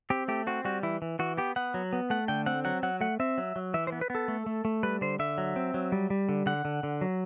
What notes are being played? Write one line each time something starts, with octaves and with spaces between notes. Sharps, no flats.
C4 G4
A3 G4
C4 F#4
G3 F#4
E3 E4
E3
E3 F#4
B3 G4
B3 F#5
F#3
B3
A3 F#5
D3 G5
C4 F#5
F#3 F#5
F#3 F#5
A3 F#5
C4 E5
F#3
F#3
E3 E5
C5
B3
B4
B3 A4
A3
A3
A3
G3 B4
D3 C5
D3 E5
F#3
C4
F#3
G3
G3
D3
D3 F#5
D3
D3
F#3